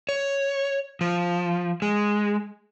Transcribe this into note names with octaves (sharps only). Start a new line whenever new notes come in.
C#5
F3
G#3